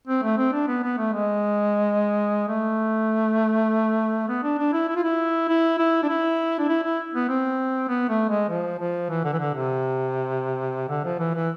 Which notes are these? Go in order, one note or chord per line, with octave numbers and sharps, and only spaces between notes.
C4
A3
C4
D4
B3
B3
A3
G#3
A3
B3
D4
D4
E4
E4
F4
E4
E4
E4
D4
E4
D4
E4
E4
B3
C4
B3
A3
G#3
F3
F3
E3
D3
E3
D3
C3
D3
F3
E3
E3